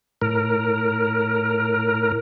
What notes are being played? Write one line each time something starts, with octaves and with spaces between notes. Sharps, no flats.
A2 A#4